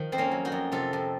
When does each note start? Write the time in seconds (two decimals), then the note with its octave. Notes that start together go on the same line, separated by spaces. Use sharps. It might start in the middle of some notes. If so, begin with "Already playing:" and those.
Already playing: D#3 F3
0.12 F2 C4
0.18 A#3 C#4
0.31 F#3
0.45 D#4 F#4
0.52 F2
0.72 C3 F4 A4
0.93 F2